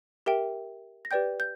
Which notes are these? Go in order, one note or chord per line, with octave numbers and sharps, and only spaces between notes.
G4 A#4 E5 G5
A#6
G4 B4 D5 G5 G6
G6